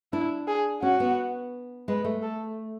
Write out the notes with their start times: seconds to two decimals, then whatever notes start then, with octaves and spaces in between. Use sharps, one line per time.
0.13 D4 E4
0.48 G#4
0.82 C#4 F#4
1.00 B3
1.88 G#3 B4
2.05 A3
2.22 A4